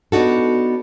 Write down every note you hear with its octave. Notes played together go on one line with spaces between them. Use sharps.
B3 D4 D#4 F#4 A4